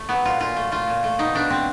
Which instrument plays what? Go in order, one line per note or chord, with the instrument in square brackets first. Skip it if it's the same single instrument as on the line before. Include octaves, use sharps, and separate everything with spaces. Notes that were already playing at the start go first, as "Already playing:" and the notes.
Already playing: [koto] A3
F#3 B3
A#2 F4
A#2 F4
A3
A3 F4
A#2
A3
B2 D#4
B2 D4
B2 C4